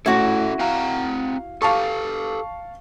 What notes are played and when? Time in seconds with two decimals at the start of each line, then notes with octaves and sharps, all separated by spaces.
0.06 A2 C#4 E4 F#4 A4
0.59 C4 F5 F#5 A#5
1.62 G4 A4 F5 A5 C#6